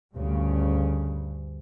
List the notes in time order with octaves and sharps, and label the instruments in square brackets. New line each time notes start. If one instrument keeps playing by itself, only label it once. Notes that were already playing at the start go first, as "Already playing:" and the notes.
[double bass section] D2 G2 C#3